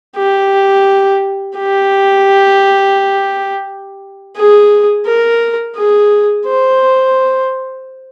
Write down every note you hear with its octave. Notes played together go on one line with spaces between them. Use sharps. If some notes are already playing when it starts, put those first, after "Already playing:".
G4
G4
G#4
A#4
G#4
C5